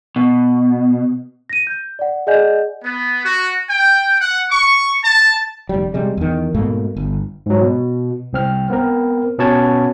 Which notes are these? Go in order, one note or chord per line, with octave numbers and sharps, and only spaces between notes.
B2
A#6 D#7
G6
D5 F#5
G#4 D5 D#5 F#5 G#5 G6
B3
F#4
G5
F#5
C#6
A5
F1 G3
C3 G3 G#3
E2 D#3
G#2 B2 A3 A#3
G1
G#2 F#3
B2
C2 C4 F6
B3 C4 A#4
B2 B3 C#4 F#4 A5 G#6